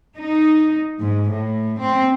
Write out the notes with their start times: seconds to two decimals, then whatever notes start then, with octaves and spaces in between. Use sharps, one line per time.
0.18 D#4
1.00 G#2
1.31 A2
1.80 C4